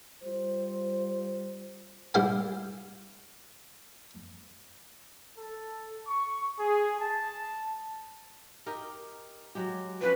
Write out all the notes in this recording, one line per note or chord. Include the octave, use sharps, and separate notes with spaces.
G3 F4 C5
G2 E4 C5 F5 F#5 G#5
A4
C#6
G#4
A5
D#4 G4 A#4
F#3 G#3 G4
F3 C4 C#4 B4